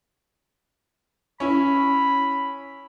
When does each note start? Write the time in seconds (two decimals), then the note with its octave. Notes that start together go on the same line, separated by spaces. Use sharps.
1.40 C#4 E4 B5